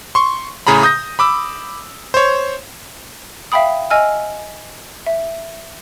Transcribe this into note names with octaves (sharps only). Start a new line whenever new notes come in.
C6 C#6
A2 C#3 G#4 A#5 B5
D#6 G6 A#6
B5 D6 E6
C5 C#5
E5 F5 G5 B5 D#6
D#5 G#5 E6 F6
E5